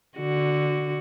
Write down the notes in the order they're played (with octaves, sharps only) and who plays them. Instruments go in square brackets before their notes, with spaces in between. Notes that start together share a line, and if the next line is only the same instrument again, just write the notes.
[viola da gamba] D3 F#4